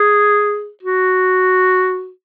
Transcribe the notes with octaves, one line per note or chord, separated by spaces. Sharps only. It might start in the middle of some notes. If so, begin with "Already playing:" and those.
Already playing: G#4
F#4